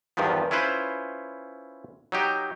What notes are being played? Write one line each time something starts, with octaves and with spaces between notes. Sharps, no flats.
E2 G2 D#3 F3 B3
C#4 E4 F4 B4 C5
F#3 D#4 G4